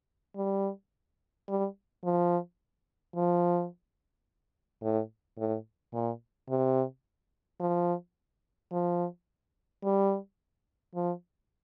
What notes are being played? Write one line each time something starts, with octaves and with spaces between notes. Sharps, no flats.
G3
G3
F3
F3
A2
A2
A#2
C3
F3
F3
G3
F3